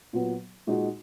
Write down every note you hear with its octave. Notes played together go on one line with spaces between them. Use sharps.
A#2 F#3 B3
A#2 G#3 D#4 F#4